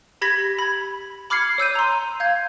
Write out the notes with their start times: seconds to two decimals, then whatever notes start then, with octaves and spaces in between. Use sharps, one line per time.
0.22 G4 B5 G#6 A#6 B6
0.59 B5 G#6
1.30 B5 D6 F6 G#6 C7 C#7
1.58 C#5 E6 G6 D#7
1.75 A#5 C6
2.20 F5 G6 G#6